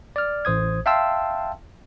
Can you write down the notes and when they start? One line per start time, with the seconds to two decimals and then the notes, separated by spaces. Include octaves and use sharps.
0.16 D5 F6
0.45 A1 C5 D#6 G#6
0.86 E5 F5 G5 A5 C6 E6